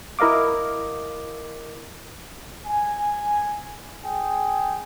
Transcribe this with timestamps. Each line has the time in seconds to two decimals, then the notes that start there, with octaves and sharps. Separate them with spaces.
0.19 E4 A#4 D#5 F5 D6
2.67 G#5
4.04 G#4 G5